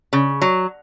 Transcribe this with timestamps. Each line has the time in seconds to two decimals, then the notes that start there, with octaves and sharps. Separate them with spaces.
0.13 C#3
0.42 F#3